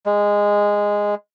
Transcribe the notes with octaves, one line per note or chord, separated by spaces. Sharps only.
G#3